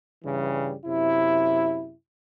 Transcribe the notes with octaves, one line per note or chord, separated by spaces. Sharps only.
G2 C#3 E3 G3
F#2 C3 E4